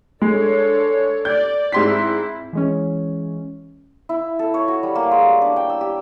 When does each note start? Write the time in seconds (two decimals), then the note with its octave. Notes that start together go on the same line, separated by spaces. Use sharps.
0.22 G#3 D4 A4 C#5
1.25 D5 G6
1.72 G#2 C4 E4 C6 B6
2.53 E3 G#3 C#4
4.09 E4
4.39 A4
4.54 C#5
4.68 F#4
4.83 G3
4.95 A#3
5.11 G#3
5.26 G3
5.42 D4
5.56 G5
5.70 E6
5.81 G4